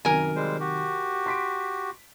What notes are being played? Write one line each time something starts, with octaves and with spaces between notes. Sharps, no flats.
F#2 C3 D#3 F#3 A#4 G#5
G3 G#3 C5
F#4 G4
C6 B6 D7